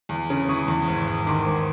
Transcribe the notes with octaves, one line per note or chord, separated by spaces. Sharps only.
E2
C#3
E3 C#6 D#6
E2
G#1
G#1
D#3 C6 D6
G#1